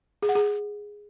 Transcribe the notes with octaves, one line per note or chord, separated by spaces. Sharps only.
G#4
F#5
G#4